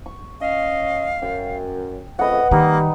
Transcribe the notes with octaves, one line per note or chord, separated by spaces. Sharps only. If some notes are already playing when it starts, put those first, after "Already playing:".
C#6
C#4 D#5 F5
F#2 G5
F2 C#3 A3 B4 D#5 F#5
D#3 G3 A#3 D#4 G4 B4